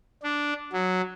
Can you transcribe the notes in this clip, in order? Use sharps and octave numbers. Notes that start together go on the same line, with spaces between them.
D4
F#3